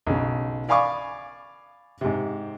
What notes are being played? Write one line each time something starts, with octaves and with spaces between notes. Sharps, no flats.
B1 C#3
D5 F5 G#5 B5 C#6 D6
G#2 C3